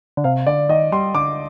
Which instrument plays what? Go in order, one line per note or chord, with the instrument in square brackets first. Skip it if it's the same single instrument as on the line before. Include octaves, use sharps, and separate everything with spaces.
[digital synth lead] D3
[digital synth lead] C3 [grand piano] F5
[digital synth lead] D3 [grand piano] D5
[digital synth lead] D#3 [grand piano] D#5
[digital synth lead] G3 [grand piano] C6
[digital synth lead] D3 [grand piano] D6